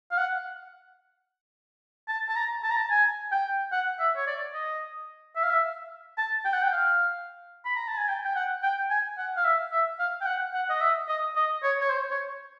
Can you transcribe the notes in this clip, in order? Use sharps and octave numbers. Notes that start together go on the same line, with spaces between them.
F5
F#5
A5
A5
A#5
A5
A#5
A5
G#5
G5
F#5
E5
C#5
D5
D#5
E5
F5
E5
A5
G5
F#5
G5
F5
B5
A#5
A5
G#5
G5
G5
F#5
G5
G#5
F#5
F5
E5
E5
F5
G5
F#5
F#5
D#5
E5
D#5
D#5
C#5
C#5
C5
C#5